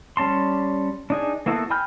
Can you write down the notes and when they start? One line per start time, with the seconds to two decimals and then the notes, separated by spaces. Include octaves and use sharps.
0.17 G3 C#4 A5 C6
1.10 D4 D#4 G#4
1.46 A#3 B3 E4 F#4 A4
1.70 G5 G#5 B5 F6 G6